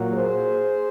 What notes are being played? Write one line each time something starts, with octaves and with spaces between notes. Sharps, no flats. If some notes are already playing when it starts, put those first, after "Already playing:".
Already playing: A#2 F#3 A#3
G#4 C5